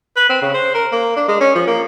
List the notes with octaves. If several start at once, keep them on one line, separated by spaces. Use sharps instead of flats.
B4
C4
C#3
C5
A#4
A#3
D4
G#3
C#4
F3
A#3